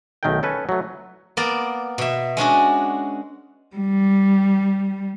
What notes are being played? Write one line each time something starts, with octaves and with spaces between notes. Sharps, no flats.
B1 D#3 A3 G#4 A#4 G5
C#4 A4 B4 G#5
F#3 A3
A#3 B3 A#4 D5
B2 E5
G#3 C#4 D4 F#4
G3